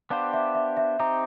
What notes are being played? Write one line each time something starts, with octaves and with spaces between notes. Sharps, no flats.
B3 D4 G4 C5 F5
E5
E5
E5
C4 D#4 G4 A#5